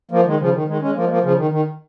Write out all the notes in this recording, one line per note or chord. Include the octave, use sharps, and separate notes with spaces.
F3 A#3
D#3 G#3
C#3 F3
D#3
D#3 G#3
G#3 C#4
F3 A#3
G#3
F3 A#3
C#3 F3
D#3
D#3